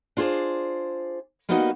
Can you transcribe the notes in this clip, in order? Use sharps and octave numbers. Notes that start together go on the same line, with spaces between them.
D4 F4 G#4 B4 C5 D5
G3 A#3 B3 D#4 F#4 D#5